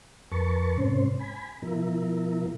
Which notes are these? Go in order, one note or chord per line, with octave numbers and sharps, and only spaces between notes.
F2 A#4 B4 A5 C#6
G#2 C3 C#4 C5
G#5 B5
B2 F3 E4 A#4